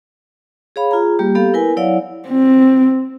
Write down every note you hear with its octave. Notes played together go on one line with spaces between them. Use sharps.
G#4 C#5 F5 B5
F4 G#4 A#5
G3 A#3 G4
B3 G4 A4 F5
E4 A#4 B4 G#5
F#3 E4 C#5 D5 F5 F#5
C4